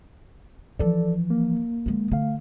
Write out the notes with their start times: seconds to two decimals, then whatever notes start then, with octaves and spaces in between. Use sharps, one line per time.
0.79 E3 F3 A4 D5
1.30 A#3
1.86 D3 G#3
2.12 D3 A3 F5